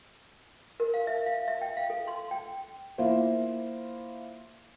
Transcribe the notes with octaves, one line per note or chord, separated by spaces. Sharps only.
A#4
F5
E5
F5
E5
G5
F5
A4
C6
G5
A#3 E4 F4 C5 E5